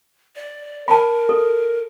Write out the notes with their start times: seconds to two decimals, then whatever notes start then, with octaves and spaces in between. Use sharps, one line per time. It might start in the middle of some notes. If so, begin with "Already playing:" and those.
0.36 D5
0.88 A#4 A5 B5
1.29 A4